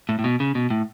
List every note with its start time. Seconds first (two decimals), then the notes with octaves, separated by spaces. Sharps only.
0.09 A2
0.19 A2
0.24 B2
0.40 C#3
0.55 B2
0.70 A2